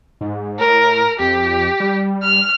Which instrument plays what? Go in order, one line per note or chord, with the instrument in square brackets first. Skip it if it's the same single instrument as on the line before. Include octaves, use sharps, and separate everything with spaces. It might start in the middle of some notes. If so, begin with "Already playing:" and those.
[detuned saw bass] G#2
[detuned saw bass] A2 [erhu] A#4
[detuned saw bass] F2 [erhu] G4
[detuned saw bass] G3
[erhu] F6